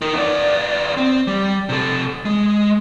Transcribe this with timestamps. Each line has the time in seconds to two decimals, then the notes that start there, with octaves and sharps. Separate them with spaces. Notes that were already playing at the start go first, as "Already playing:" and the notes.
0.02 D#4 A#4
0.15 B3 D5
0.97 C4
1.27 G3
1.69 C3 A4
2.25 G#3